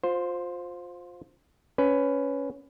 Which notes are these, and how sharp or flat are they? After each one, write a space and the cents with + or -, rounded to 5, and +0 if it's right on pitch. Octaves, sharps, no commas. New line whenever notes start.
F4 +25 C5 +0
C#4 +10 B4 +15